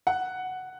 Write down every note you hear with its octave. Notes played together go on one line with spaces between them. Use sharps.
F#5